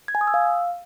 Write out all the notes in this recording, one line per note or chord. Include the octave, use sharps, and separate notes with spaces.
G#6
G#5
D#6
E6
F5